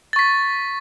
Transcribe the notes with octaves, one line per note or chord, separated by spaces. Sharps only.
C#6 A6 B6